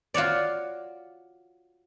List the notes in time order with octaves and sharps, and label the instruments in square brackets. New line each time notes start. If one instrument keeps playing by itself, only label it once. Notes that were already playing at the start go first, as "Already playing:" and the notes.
[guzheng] F4 F#4 C#5 D5